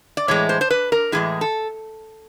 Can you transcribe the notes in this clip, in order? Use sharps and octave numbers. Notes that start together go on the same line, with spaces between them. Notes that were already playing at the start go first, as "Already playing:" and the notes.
D5
A2 E3 G#3 C#5
C5
C5
B4
A#4
A2 E3 G#3 G#4
A4